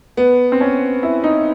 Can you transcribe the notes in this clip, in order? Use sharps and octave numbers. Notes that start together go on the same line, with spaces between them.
B3
C4
C#4
E4
D#4